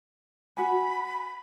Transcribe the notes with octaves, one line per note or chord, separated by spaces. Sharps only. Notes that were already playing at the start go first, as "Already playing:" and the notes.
F#4 G#5 B5